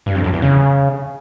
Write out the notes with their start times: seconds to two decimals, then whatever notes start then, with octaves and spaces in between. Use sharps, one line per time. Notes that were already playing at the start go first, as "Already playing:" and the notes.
0.06 G2
0.15 F2
0.24 F#2
0.33 E2
0.42 C#3